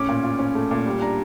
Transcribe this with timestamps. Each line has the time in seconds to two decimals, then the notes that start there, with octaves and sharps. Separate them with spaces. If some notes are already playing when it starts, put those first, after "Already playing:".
Already playing: A2 C#4 D6
0.09 A#2
0.24 F4
0.39 C#4
0.55 A3
0.71 A#2
0.86 G3
1.01 D4 A#5